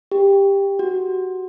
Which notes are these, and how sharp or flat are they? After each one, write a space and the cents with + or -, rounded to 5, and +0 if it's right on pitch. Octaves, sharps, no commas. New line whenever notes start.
G4 +10
F#4 +5